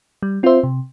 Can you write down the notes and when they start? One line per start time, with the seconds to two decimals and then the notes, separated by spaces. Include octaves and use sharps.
0.23 G3
0.43 C4 F4 C5 E5
0.63 C3